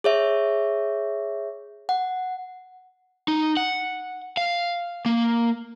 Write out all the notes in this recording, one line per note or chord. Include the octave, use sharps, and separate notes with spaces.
G#4 C#5 E5
F#5
D#4
F#5
F5
A#3